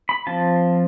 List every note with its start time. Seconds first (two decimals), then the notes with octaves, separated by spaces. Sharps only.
0.09 B5
0.27 F3 C4 F4 A5